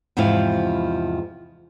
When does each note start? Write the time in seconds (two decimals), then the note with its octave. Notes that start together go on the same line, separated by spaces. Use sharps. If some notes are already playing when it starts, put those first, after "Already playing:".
0.17 E2 G#2 C3 F3 E4 F5